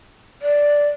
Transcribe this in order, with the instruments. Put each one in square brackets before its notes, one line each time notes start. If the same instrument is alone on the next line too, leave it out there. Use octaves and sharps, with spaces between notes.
[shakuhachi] D5